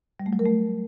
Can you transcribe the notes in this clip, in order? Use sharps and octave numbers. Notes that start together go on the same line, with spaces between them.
G3
A3
F#3
A#4
A3